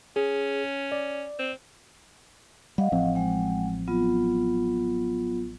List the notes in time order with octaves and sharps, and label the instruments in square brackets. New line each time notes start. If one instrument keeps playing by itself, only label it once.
[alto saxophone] C#4 [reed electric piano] G#4
[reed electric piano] D5
[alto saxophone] C4
[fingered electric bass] G3 [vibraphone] D#5 F5 F#5
[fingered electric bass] A1 F3 C4
[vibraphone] G#3 F#5 G5
F#3 B3 F4